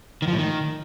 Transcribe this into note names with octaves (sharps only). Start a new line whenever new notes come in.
D#3
F3
A2
D#3